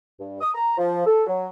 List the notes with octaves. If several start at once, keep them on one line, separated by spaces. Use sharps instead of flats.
G2
D#6
A#5
F3
A4
F#3